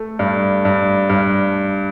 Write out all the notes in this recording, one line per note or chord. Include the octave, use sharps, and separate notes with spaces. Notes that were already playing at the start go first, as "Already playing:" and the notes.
Already playing: A3
G2
G2
G2